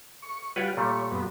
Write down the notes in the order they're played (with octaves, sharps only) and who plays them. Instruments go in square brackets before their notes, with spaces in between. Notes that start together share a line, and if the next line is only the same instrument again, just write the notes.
[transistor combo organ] C#6
[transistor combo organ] G3 F4 F#4 [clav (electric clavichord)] B4 C#5 D5
[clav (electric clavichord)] A#2 G3 A3 [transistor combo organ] C#5
[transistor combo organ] F#2 B3